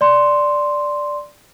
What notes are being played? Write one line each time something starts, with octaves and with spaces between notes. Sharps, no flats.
D5 C6